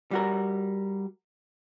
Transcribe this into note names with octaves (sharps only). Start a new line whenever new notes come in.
G3 F#4 A#4